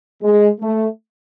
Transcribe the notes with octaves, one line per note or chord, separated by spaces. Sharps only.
G#3
A3